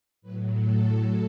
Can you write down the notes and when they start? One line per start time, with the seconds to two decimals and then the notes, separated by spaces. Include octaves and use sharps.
0.22 A2 F#3 B4
0.51 A4